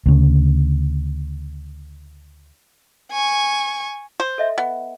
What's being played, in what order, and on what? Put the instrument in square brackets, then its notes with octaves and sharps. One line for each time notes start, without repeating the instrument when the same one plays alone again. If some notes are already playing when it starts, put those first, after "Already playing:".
[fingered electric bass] D2 C#3
[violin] G#5 C#6
[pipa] C5
[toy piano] A4 D#5 E5
[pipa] B3